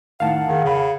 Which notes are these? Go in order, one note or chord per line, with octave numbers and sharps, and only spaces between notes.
A2 D#3 F5 F#5 A5
D#3 G#4
C#3 C#5 B5